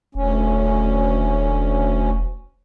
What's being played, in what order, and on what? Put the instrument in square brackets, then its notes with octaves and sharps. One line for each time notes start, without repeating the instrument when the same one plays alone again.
[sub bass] E1 [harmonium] D2 C#4